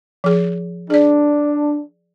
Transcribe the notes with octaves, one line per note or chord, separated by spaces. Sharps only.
F3 G#4
D4 G#4 D5